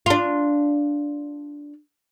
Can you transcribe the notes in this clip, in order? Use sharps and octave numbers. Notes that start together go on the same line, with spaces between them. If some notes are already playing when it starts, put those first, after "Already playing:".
D4 F4